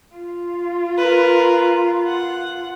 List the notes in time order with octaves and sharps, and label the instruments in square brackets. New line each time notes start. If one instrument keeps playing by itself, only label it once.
[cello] F4
[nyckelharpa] A#4 B4
F#5